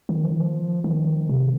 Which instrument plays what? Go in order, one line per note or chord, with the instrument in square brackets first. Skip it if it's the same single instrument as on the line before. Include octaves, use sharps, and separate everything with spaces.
[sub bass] D#3
F3
D#3
F3
D#3
C3